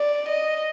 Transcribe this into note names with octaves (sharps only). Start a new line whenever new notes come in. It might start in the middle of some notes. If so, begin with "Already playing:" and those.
Already playing: D5
D#5